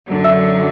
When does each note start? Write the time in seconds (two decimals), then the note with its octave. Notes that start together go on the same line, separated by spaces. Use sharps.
0.09 F#2 D3 F#3
0.24 E5 E6